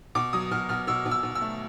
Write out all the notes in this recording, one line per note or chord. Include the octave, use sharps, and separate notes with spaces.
B2 D6
F#3 D#6
B2 F6
B2 F6
B2 E6
B2
E6
B2
E6
A3